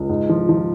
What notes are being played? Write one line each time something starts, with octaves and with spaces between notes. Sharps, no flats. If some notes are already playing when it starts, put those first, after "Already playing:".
Already playing: C#2
G#2
F3
F3